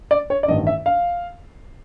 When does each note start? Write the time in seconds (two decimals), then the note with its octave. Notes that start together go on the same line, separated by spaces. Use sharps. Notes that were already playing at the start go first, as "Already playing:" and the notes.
0.11 D5
0.30 C#5
0.43 D5
0.48 A1 G2 D#3 D#5
0.67 E5
0.86 F5